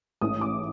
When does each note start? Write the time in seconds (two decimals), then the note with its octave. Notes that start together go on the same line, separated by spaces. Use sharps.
0.21 A1 G#2 E3 A3 D#6
0.41 D6